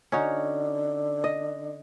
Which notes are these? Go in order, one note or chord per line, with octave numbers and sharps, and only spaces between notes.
D3 C#4 D#4 F#4
D#5